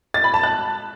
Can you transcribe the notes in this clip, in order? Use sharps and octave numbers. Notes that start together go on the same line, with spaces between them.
A6
B5
A5
F#6